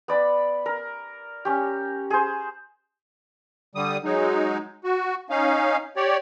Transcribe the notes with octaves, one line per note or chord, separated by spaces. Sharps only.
B3 D5 B5
A#4
C#4 G4
G#4 C5
D3 G3 D#6
F#3 G#3 D#4
F#4
C#4 D#4 F5
G4 C#5 D5